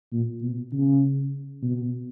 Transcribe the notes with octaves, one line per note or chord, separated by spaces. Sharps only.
A#2
B2
C#3
B2